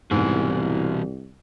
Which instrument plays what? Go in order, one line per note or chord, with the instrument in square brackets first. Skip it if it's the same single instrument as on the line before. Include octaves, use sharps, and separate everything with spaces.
[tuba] C2 [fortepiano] G#2 [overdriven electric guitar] B2 E3